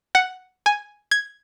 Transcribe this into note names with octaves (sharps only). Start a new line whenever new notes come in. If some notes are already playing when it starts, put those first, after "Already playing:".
F#5
G#5
G#6